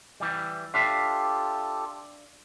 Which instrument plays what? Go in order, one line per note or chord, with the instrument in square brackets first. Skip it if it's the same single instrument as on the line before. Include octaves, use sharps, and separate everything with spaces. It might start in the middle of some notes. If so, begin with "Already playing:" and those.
[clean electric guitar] E3 G3
[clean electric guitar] D4 E5 F5 [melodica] F4 G4 A4